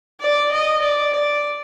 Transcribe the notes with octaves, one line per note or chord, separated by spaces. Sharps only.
D5
D#5
D5
D5